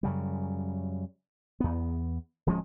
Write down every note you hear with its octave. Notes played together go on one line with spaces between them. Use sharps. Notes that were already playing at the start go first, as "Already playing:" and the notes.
F#2 C#3 G3
E2 B3
D1 F3 G#3 C#4